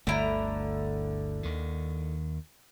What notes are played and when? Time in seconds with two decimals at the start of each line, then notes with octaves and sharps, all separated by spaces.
0.07 G1 D2 D3 A3 E4 A#5
1.43 D#2 D#3